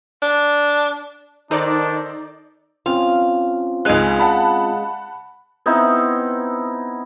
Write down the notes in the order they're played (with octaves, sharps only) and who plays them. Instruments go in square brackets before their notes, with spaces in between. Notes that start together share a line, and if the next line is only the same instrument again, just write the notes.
[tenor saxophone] D4
[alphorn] D#3 [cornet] D4 [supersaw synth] D#4 D5 [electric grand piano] A4 C5 A#5
[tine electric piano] C4 C#4 F4 [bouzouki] F5
[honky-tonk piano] C#2 D#4 F#6 [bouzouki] G#3 F5 G#5
[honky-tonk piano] F#5 A5 B5
[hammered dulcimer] B3 C4 D#4 E4